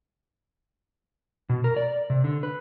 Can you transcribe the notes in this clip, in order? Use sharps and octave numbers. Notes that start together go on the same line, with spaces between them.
B2
A#4
D5
C3
D3
B4